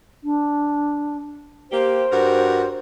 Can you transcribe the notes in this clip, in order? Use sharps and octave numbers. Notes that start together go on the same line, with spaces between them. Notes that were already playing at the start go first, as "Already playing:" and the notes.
D4
A#3 G4 C5
G2 F#4 A#4